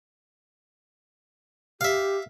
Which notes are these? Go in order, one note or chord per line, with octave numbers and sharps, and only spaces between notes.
G4 E5 F5